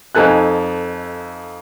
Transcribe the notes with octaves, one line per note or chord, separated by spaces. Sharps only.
F2 D#4 A4 G#5 F#6